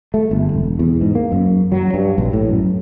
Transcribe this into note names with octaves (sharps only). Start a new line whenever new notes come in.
A3
G1
E1
E2
G#2
A#3
F#2
F#3
G2
A#1
A2
F#2